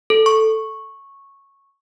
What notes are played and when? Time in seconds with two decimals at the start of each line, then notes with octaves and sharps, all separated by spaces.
0.10 A4
0.26 C#6